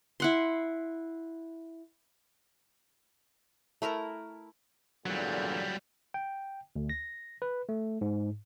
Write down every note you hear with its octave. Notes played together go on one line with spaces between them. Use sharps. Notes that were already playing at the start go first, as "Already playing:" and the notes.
E4 F#5 C6
A3 E4 A#4 A#5
E2 A#2 D3 F#3 G3
G5
D2
A#6
B4
A3
G#2